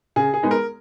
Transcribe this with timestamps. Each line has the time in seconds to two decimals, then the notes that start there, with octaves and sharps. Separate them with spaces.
0.16 C#3 G#4
0.34 G#4
0.43 G#3 B3 D#4
0.51 A#4